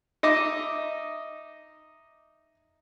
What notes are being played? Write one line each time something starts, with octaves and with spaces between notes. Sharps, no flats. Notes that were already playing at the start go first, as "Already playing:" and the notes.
D#4 D#5 E5 D6